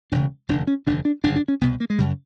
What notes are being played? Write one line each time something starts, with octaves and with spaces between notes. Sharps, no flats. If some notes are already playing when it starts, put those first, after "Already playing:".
E1 D2 C#3 D4
F1 D#2 D3 D4
C#4
F1 D#2 D3 D4
D4
G1 F#2 C#3 D4
D4
C#4
C2 B2 B3
A#3
G#3
F#2 C#3 G3